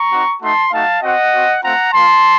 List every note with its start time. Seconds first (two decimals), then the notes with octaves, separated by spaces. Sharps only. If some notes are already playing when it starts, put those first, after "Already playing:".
Already playing: A#5 C#6
0.11 C4 D#4 F#4
0.41 A3 D#4 F#4 A5 C6
0.72 A3 D#4 F#4 F5 A5
1.02 C4 F#4 D#5 F#5
1.33 C4 F#4
1.63 A3 C4 F4 F#5 A#5
1.93 A#3 F4 A5 C6